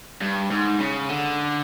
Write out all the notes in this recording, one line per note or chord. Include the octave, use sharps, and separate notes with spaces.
G2
G#2
C#3
D3